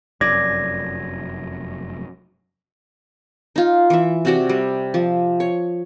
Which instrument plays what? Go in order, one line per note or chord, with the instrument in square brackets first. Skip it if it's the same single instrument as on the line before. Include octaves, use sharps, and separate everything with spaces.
[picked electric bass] F1 F#2 [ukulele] D5 [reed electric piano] G#6 [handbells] A#6
[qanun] D#4 F4
E3 E5
C3 F#4 D5
G3
F3
C#5